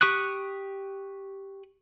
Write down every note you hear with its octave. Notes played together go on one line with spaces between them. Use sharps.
G4 C#6 D#6 F#6